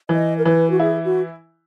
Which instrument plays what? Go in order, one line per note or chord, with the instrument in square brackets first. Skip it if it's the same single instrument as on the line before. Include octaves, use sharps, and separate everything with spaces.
[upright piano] E3 [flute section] D#5
[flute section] A#4
[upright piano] E3 [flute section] B4
[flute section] F#4
[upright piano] E4 [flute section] G#4
[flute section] F#4